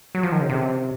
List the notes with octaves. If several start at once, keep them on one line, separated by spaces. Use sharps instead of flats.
F#3
F3
D#3
C#3
C3